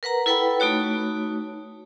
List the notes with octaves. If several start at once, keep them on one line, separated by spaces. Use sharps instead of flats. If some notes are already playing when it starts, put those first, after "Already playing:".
A#4 B4 F#5 A#5
E4 A4 B4 F#5 G5 B5
A3 D#4 F#4 C#5